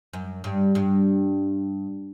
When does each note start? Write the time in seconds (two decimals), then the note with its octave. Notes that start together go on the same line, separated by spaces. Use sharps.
0.13 F#2
0.44 G2
0.75 G2